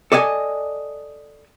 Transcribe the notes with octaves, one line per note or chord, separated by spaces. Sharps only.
A4 D5 D#5 F5 G#5